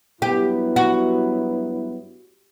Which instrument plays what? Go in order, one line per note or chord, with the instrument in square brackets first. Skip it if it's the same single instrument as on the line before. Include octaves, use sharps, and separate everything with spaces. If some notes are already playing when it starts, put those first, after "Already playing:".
[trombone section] G2 F#3 B3 E4 [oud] G4
[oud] F#4